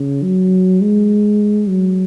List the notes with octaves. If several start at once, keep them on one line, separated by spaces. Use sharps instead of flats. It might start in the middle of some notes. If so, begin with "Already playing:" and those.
Already playing: C#3
F#3
G#3
F#3